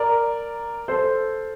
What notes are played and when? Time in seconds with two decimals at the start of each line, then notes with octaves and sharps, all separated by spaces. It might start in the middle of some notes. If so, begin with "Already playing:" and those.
Already playing: A#4 D5
0.88 A4 C5